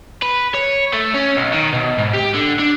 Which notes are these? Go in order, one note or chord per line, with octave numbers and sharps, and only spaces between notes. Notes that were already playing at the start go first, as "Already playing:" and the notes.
B4
C#5
A3
C#4
B1
D#3
B2
G#2
G4
D3
D4